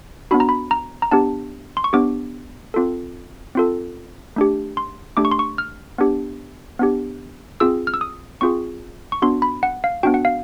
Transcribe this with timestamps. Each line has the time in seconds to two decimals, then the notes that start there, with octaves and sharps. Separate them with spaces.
0.31 B3 D4 F#4 B5
0.40 A#5
0.49 B5
0.71 A#5
1.02 A#5
1.11 B3 D4 G4 A5
1.77 C6
1.84 C#6
1.93 B3 D4 G4 D6
2.74 C4 F4 A4
3.55 C4 F4 A4
4.36 A3 D4 G4
4.77 C6
5.17 A3 D4 G4 D6
5.25 C#6
5.31 C6
5.39 C#6
5.58 F6
5.98 B3 D4 G4
6.79 B3 D4 G4
7.60 C4 F4 G#4 E6
7.87 F6
7.94 E6
8.01 D#6
8.41 C4 F4 G#4 C#6
9.12 C#6
9.22 B3 D4 F#4 C6
9.42 B5
9.63 F#5
9.84 F5
10.03 B3 D4 F#4 G5
10.14 F#5
10.25 F5